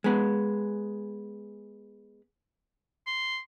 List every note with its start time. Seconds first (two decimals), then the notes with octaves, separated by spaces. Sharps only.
0.04 G#3 B3
3.07 C6